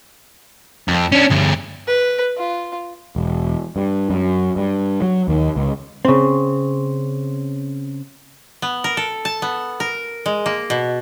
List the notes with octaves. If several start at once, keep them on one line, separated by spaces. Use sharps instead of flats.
F2
C#4 D4
D2 G2
B4
F4
E1
G2
F#2
G2
F#3
D#2
C#2
C#3 C4
B3
A#4
A4
A5
B3
A#4
G#3
A#3
B2